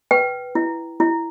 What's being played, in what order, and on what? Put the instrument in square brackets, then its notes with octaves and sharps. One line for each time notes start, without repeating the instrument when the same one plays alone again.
[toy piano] B4 G5
E4
E4